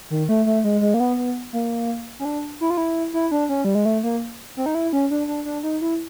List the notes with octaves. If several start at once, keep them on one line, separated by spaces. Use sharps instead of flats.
D#3
A3
A3
G#3
G#3
A#3
B3
B3
A#3
C#4
D4
E4
F4
E4
E4
D4
C#4
G3
G#3
A3
A#3
C4
D#4
E4
C#4
D4
D4
D4
D#4
E4